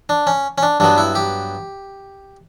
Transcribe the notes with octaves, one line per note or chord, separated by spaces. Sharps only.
D4
C#4
C#4
D4
G2 F#3 B3 D4
E4
G4